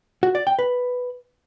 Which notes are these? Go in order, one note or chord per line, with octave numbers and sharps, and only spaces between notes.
F#4
D5
G5
B4